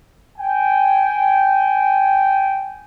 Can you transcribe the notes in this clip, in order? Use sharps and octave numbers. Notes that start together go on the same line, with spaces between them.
G5 G#5